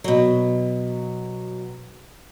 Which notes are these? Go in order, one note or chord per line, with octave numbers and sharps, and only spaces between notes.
B2 F#3